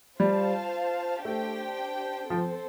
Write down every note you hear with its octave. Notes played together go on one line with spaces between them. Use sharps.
G3 F4 C5 F5 A5
A3 D4 G4 C5 G5
F3 C4 A4 C5